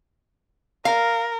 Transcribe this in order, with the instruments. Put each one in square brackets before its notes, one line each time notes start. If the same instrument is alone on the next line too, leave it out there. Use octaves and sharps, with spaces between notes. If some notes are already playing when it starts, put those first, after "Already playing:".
[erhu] A#4 [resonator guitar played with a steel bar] F5